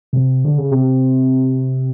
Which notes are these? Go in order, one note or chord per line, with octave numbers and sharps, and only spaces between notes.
C3
D3
C#3
C3